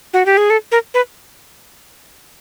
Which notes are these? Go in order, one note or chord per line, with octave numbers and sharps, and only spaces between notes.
F#4
G4
G#4
A4
A#4
B4